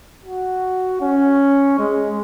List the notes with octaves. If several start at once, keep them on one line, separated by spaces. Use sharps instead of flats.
F#4
C#4
G#3